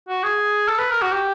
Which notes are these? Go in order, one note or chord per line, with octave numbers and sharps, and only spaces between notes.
F#4
G#4
A4
B4
A#4
F#4
G4